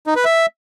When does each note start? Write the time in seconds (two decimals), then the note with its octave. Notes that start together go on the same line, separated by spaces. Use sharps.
0.07 D#4
0.16 B4
0.25 E5